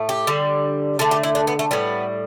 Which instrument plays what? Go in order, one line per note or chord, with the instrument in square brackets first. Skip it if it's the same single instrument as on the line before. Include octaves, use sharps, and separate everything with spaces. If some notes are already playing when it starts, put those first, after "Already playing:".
Already playing: [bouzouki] A2 A3
G4
D3 G3
D3 A3 A4
G4
E4
D4
B3
A3
A2 G3 B3